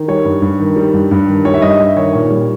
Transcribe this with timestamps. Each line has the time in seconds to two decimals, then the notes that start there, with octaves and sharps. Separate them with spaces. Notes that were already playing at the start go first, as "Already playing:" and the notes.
Already playing: D#3
0.08 G3 C#5
0.25 G2
0.42 G2
0.60 D#3
0.76 G3
0.94 G2
1.11 G2
1.28 D#3
1.45 G3 C#5
1.54 E5
1.62 G2 D#5
1.79 G2 E5
1.96 D#3 C#5
2.13 A#2 C#5
2.31 G3